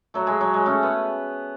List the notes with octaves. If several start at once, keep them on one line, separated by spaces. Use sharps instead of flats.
F#3 A3
G#3
F#3
G#3
A3 C#4
B3